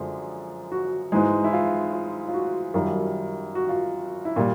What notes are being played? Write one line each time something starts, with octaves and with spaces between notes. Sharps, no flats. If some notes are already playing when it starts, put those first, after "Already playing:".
Already playing: F#2 D3 F3 G#3
F#4
G#2 E3 G#3
E4
F4
F4
F4
F#4
F#2 D#3 G3 F4
F#4
F4
E4
A#2 G3 F4